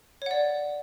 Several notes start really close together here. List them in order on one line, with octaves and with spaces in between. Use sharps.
C#5 F#5 D5